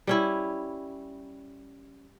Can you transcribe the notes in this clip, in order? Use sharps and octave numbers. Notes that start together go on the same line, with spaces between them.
G3 C#4 E4